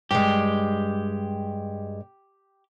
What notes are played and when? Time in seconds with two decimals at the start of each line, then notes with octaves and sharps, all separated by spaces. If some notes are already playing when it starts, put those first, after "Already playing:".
0.11 G2 G#3 G4